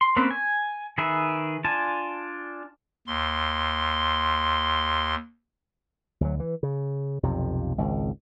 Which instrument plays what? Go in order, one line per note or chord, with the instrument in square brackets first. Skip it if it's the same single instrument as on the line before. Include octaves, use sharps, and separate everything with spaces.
[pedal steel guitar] C6
A#3 C4 C#4 B4
G#5
D#3 G#4 B4 E5
D4 F4 G#5 A5
[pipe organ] D#2 C6
[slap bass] D2 F#3
E3
C#3
B1 F2 C3
G#1 C#2